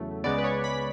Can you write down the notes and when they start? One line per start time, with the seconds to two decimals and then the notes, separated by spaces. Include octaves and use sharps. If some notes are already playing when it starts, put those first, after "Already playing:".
Already playing: E2 C#3 F#3 A3
0.24 C#2 C#3 G#3 B3 D5
0.38 B4
0.44 C#5
0.64 B5